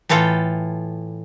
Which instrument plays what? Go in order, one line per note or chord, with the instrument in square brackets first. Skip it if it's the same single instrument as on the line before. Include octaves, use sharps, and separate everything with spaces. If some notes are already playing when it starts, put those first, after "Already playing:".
[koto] A2 E3 F4 A4 G5